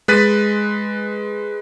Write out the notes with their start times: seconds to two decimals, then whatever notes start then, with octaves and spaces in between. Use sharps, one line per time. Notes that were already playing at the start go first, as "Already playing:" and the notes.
0.08 G#3 B4 F#6 A6 B6 D#7